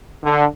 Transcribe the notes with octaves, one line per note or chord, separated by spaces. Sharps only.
D3